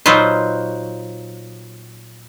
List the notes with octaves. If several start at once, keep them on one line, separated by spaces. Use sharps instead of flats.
A#2 F#3 D#4 F4 B4 C5